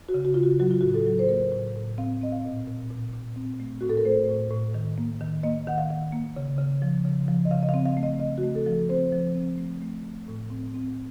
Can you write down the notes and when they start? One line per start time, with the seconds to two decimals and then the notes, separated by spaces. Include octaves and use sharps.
0.09 F#4
0.14 C#3
0.25 F#4
0.34 C#3 F4
0.43 F#4
0.60 F#3 F#4
0.71 F4
0.81 A2 F#4
0.94 A4
1.06 F#3
1.19 C5
1.29 A#3 A#4
1.52 A2
1.76 A2
1.98 C4 F5
2.22 C4 D#5
2.32 F5
2.45 A#2
2.67 A#2
2.90 A#2
3.14 A#2
3.36 C4
3.60 A3
3.81 A2 F#4
3.89 A4
3.97 A#4
4.05 A3 C5
4.29 A2
4.51 A2
4.74 D#3
4.98 A#3
5.21 D#3
5.43 A#3 D#5
5.67 D#3 F#5
5.78 F5
5.90 D#3
6.12 A#3
6.37 C#3
6.58 C#3
6.82 F3
7.05 C#3
7.28 F3
7.45 D#5
7.51 C#3 F5
7.63 D#5
7.69 F5
7.74 C4
7.86 F5
7.97 A3
8.03 D#5
8.20 C#3 D#5
8.38 F#4
8.43 A3
8.55 A4
8.66 F3
8.89 C4 C5
9.13 F3
9.35 C4
9.58 A3
9.82 A3
10.04 A3
10.28 A2
10.50 C4
10.74 C4